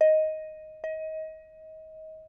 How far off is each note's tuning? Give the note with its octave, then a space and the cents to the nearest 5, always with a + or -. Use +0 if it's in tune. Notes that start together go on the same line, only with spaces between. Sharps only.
D#5 +5
D#5 +25